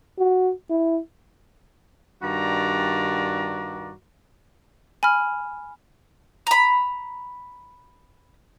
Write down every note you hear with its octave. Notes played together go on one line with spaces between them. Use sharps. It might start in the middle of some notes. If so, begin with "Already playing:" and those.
F#4
E4
G2 D#3 F#4 D5 A#5
G#5 B5 F6
A#5 B5